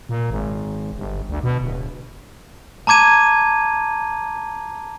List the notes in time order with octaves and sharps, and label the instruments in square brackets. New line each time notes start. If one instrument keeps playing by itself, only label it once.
[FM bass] A#2
G#1
G1
D2
B2
D1
[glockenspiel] A5 A#5 D6 G#6 D#7